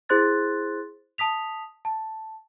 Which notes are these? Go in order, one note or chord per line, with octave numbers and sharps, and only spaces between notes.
E4 G#4 C5 C6 F#6 A6
A5 D#6 B6 F7
A5